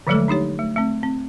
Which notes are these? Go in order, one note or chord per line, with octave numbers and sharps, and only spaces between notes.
D3 F3 F#3 G#3 A3 A4
D4 D#4 G4 C#5
A3
A3 C4
C4